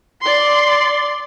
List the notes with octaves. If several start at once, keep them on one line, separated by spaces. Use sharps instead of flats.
D5 C6